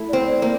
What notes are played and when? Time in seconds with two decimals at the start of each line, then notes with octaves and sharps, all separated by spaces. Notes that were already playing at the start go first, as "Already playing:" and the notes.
Already playing: A3 E4
0.09 D5
0.13 C4 C5
0.27 D5
0.42 A#3 C5